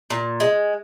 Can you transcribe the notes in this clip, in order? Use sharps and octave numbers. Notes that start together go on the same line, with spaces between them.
A#2
G#3